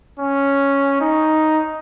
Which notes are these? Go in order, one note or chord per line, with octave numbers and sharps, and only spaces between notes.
C#4
D#4